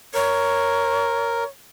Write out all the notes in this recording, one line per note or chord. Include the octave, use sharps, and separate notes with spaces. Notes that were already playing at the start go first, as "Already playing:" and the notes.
A#4 C#5